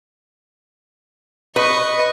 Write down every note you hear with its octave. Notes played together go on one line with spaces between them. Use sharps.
B4 D#5 C#6